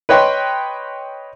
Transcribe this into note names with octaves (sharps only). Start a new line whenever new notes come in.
B4 C#5 D#5 G5 C6